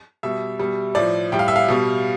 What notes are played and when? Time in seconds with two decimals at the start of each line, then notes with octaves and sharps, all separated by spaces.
0.23 B2 G3 E5
0.59 B2 G3
0.95 A2 F3 D5
1.32 A2 G3 G5
1.39 F5
1.48 E5
1.56 F5
1.68 B2 G3